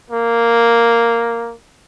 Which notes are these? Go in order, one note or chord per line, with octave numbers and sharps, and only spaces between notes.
A#3